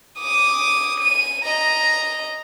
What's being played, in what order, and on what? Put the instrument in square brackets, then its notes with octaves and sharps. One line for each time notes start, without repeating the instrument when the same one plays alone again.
[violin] D6 D#6
D#7
D#5 A#5